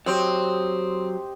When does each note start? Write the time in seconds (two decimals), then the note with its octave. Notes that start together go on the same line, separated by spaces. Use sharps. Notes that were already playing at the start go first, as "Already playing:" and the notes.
0.06 F#3 C4 G4 C5 D#5